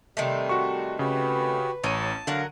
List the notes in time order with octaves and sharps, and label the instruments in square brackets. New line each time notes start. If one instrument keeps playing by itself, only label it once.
[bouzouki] C3 D#3 A3 [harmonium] G3
[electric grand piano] F#4 C#6
[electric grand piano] C#3 [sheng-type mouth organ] F#4 G4 [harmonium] B4
[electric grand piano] A1 D#7 [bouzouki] C#4 [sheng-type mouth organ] A5
[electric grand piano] D3 [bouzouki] F#3 A#4 F#5 [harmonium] F5